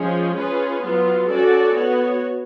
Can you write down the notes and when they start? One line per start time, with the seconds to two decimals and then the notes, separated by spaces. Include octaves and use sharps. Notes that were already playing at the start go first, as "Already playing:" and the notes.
Already playing: F3 G#3 C#4 G#4
0.35 C#4 F4 G#4 B4
0.82 F#3 B3 F4
1.28 C#4 F#4 A4 D5
1.75 B3 F#4 C#5